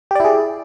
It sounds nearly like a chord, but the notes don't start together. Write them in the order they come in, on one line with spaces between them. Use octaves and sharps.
G4 D5 E4 G#4